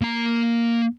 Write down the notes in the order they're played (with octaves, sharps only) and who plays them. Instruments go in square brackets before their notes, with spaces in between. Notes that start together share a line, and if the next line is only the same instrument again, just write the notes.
[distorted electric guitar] A#3 A#5